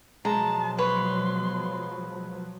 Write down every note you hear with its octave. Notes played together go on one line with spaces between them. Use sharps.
B2 F3 F#3 G#3 A5 A#5
B4 C#5 C6